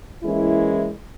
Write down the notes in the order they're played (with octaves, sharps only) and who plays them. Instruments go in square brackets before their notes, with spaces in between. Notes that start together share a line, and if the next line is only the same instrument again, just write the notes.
[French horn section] E3 G#3 A#3 C#4 E4